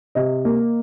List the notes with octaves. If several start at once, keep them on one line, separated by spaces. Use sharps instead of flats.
C3 D#5
A#3